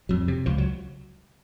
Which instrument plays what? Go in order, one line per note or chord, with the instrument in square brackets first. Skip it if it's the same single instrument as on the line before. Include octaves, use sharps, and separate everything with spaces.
[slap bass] F2 F#3
C3
C#2 F3
F#3